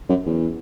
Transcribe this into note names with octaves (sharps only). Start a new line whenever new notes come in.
F#2
E2